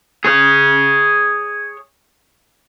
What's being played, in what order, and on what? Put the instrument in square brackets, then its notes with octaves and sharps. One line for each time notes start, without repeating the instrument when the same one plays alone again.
[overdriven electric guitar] G#4 C#5